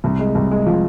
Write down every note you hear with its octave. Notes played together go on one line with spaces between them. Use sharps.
C2
G#3
C2
G#3
F3